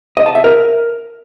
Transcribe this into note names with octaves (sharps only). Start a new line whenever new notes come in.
D#5
A5
E5
A#4